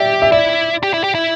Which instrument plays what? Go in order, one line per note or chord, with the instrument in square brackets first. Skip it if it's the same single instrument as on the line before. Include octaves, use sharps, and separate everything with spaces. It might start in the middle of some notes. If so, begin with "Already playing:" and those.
Already playing: [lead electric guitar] G4 [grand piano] D5 E5
[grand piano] E5
[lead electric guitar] E4 [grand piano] D5
[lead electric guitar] G4
E4
G4
E4